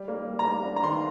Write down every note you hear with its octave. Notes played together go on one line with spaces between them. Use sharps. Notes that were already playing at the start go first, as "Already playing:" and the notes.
Already playing: G3
A#3
G3
A#5
G3
D4
A#5
D#3 C6